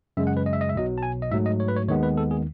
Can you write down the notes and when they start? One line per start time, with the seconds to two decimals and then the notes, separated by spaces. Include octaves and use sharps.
0.17 F#2 C#3 G#3 E5
0.27 F#5
0.37 B4
0.46 D#5
0.53 E5
0.61 D#5
0.69 E5
0.75 B1 B2 F#3 D#5
0.98 A5
1.03 G#5
1.22 D#5
1.31 G#2 F#3 A3 E5
1.46 D#5
1.60 C#5
1.68 B4
1.76 C#5
1.88 D#2 D#3 G#3 B3 C#5
2.03 B4
2.17 A4
2.31 G#4